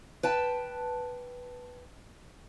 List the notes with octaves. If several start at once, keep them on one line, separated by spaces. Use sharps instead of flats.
B4 G5 A5